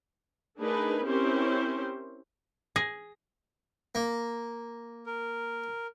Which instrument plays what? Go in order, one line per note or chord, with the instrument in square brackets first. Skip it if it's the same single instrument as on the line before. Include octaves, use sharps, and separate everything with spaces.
[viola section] A3 D4 D#4 G#4 A#4 B4
C4 C#4 E4 G4 A#4 C5
[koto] G#4 [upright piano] A#6
[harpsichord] A#3
[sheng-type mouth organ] A#4